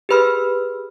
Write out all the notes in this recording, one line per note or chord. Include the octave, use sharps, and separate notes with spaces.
G4 G#4 B4 B5 F6